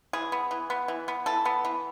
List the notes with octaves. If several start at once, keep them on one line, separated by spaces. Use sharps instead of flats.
E3 G#4
B3
E3
B3
E3
B3
E3 A4
B3
E3